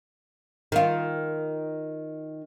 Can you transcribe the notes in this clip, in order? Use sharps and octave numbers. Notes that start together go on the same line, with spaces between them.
D#3 F4